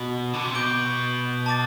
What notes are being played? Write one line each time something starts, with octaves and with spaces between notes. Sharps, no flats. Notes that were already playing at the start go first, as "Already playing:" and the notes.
Already playing: B2
D3
C3
B2 G6 D7 G7
A5 D6 A6